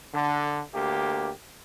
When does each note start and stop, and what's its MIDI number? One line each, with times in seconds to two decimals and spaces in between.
0.13 0.61 50
0.73 1.30 38
0.73 1.30 58
0.73 1.30 67